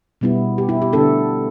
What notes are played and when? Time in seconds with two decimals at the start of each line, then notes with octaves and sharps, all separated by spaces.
0.21 B2 G3 B3 E4
0.58 G4
0.69 E4
0.82 G4
0.93 D3 B3 D4 A4